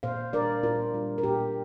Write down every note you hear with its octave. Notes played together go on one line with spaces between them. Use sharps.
A#2 C5 F5
G3 D4 A#4 D5
A#2 F4 A#4
G3 D4
A#4
A#2 G4